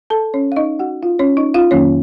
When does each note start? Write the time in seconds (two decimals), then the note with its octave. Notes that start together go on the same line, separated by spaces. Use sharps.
0.10 A4 A5
0.34 C#4 C#5
0.52 F5
0.56 D#4 D#5
0.79 F#4 F#5
1.02 F4 F5
1.19 C#4 C#5
1.37 D#4 D#5
1.54 F4 F5
1.71 F2 D#3 F#3 A#3 C#4 C#5